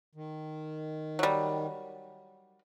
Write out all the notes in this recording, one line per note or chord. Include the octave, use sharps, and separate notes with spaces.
D#3
F#3 G3